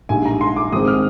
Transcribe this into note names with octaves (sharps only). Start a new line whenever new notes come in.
A#1 G#2 G3 G#5
A#5
C6
D6
G#1 G#2 D#3 G#3 C4 D#6
F6